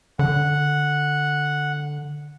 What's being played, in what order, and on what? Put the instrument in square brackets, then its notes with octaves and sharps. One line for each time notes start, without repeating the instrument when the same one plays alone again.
[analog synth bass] D3 [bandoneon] F#5